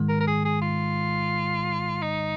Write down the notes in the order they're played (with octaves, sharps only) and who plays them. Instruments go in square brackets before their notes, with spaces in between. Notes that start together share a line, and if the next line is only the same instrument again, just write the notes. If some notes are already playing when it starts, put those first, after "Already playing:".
Already playing: [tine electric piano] G#2 D#3 G#3
[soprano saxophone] A#4
A#4
G#4
G#4
F4
D#4